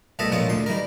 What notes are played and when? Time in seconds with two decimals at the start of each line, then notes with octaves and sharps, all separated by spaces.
0.19 C2 B2 A3 A4 D#5 E5
0.32 A#1 A#2 G#3 F4 C#5 D#6
0.49 D2 A2 C6
0.66 D#3 E3 G3 A#4